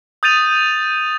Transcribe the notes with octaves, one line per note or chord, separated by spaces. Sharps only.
D#6 G6 A6 D#7 F7